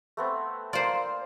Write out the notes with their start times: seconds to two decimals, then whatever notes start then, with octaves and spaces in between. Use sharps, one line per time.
0.17 A3 B3 C4
0.73 A#3 F4 C5 D5